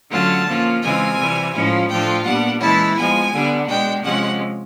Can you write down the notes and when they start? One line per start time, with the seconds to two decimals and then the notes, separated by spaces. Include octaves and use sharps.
0.11 D3 F#3 A3 C#4 F4 A5
0.46 F3 A#3 C#4 F4
0.82 C#3 E3 G#3 C4 F4 G#5
1.18 C3 E3 G3
1.53 A2 F3 G#3 C#4 E4
1.89 A2 F3 A3 D4 F4 G5
2.25 A#2 G3 B3 D4 F#5
2.61 E3 G#3 C#4 E4 A5
2.96 F3 G#3 B3 G#5
3.32 D3 G3 B3 D4
3.68 B2 G#3 B3 D4 G5
4.03 C3 F3 G#3 C#4 F#5